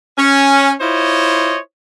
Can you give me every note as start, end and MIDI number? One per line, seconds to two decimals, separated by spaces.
0.18 0.72 61
0.81 1.58 64
0.81 1.58 65
0.81 1.58 72
0.81 1.58 73
0.81 1.58 75